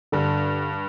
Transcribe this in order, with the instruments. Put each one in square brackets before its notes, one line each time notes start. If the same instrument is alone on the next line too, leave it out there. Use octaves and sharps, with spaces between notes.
[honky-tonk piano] G2 [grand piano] D3